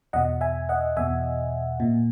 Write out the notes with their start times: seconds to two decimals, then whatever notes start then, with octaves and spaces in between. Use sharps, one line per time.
0.13 E2 B2 D#5 F#5
0.41 E5 G#5
0.69 D#5 F#5
0.97 E2 B2 E5 G#5
1.80 A#2